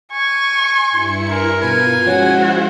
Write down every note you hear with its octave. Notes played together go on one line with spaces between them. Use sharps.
G#5 C#6
G2 E4 C#7
A#4 G#5 C6 G#6
B2 F4 B4 G#5
F3 G#3 C#4 E4 F#4 C5